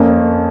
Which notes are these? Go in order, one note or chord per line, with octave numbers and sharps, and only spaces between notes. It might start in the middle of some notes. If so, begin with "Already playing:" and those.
Already playing: F2 A#3 C#4